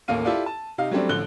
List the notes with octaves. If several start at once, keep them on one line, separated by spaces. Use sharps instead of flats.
A1 D#2 A3 A#3 F5 D#7
E4 F4 G4 A4 D5 F5
A5
C3 D#4 F5
F#3 G3 A3 C4 D4
A1 D3 F3 F#6 G7